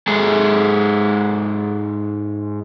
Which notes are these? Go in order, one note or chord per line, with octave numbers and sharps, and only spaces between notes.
G#2 G#3 G#4 A4